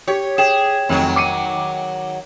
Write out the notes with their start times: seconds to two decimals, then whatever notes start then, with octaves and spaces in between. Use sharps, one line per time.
0.08 G4 C#5
0.38 G#4 G5 E7
0.89 F1 D#3 F#3
1.16 D6 C#7 D#7